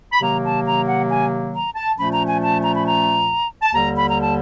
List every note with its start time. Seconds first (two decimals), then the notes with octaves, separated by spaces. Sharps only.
0.13 B5
0.21 C3 D#3 F#3 A#3 A#5
0.44 A5
0.66 A#5
0.87 F#5
1.09 G#5
1.53 A#5
1.76 A5
1.98 A#2 F3 A3 C#4 B5
2.12 A#5
2.27 G#5
2.42 A5
2.63 A#5
2.74 B5
2.86 A#5
3.62 A5
3.73 D#2 D3 G3 A#5
3.96 B5
4.08 A#5
4.21 A5